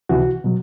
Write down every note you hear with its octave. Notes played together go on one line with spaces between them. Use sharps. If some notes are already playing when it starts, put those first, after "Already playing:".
C#2 C3 E3 F#4
B2 F#3